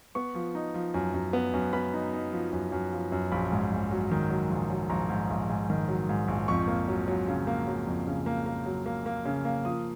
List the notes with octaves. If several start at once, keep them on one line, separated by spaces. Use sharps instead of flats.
B3 C#6
F3
D#4
F3
F#2
F#2
B3
F#2
B3 B5
D#4
D#4
F3
F#2
F#2
F3
F#2
A#1 B5
G#2
A#1
F#3
D#3
F#3
A#1
F#3
A#1 A#5
G#2
A#1
G#2
D#3
F#3
G#2
A#1
F2 C#6
A#3
F#3
F#3
C#3
A#3
F#3
F2
C#3
A#3
A#3
F#3
A#3
A#3
C#3
A#3
F3 D#6